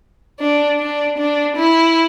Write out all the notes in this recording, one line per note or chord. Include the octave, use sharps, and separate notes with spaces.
D4
D4
D4
E4